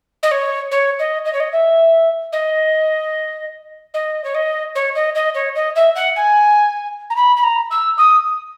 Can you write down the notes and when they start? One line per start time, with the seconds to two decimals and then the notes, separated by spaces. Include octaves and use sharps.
0.23 D#5
0.31 C#5
0.71 C#5
0.99 D#5
1.25 D#5
1.33 C#5
1.40 D#5
1.52 E5
2.33 D#5
3.94 D#5
4.24 C#5
4.35 D#5
4.75 C#5
4.96 D#5
5.15 D#5
5.35 C#5
5.56 D#5
5.76 E5
5.96 F#5
6.16 G#5
7.10 A#5
7.16 B5
7.37 B5
7.43 A#5
7.71 E6
7.98 D#6